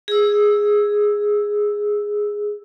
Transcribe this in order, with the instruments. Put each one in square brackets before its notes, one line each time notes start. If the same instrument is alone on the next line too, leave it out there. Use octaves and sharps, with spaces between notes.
[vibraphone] G#4 E6